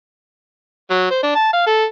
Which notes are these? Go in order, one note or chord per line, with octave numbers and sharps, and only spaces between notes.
F#3
C5
D4
A5
F5
A4